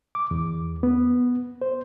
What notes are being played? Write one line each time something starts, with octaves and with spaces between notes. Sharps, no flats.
D6
E2
B3
C5